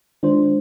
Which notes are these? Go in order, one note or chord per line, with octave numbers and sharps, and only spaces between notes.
D#3 G#3 D4 F4 C5